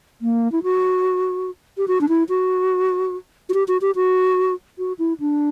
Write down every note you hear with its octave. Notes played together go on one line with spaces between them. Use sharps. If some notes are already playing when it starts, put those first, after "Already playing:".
A#3
E4
F#4
G4
F#4
D4
E4
F#4
F#4
G4
F#4
G4
F#4
F#4
E4
D4